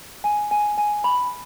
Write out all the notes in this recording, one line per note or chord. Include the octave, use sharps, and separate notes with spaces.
G#5
G#5
G#5
B5